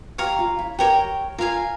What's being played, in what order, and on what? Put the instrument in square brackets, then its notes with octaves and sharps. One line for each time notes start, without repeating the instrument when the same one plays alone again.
[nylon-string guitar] G4 [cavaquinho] C#5 F5 A#5 C#6
[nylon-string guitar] F4
E4
[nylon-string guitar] G4 [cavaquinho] A#4 C#5 G5
[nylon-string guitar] F4 [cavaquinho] A#4 F5 G#5